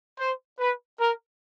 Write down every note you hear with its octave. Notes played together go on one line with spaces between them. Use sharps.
C5
B4
A#4